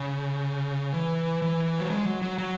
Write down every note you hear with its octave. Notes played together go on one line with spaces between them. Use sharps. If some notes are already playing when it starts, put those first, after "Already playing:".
Already playing: C#3
E3
E3
F#3
G#3
F#3
F#3
F#3